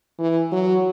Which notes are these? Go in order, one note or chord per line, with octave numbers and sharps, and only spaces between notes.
E3
F#3